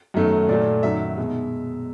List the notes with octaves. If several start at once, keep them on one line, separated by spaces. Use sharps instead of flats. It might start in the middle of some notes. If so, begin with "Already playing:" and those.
F#2 D#3 F#3 A3
A#2 F#3 A3 D5
F#2 D#3 F#3 E5
B2 G#3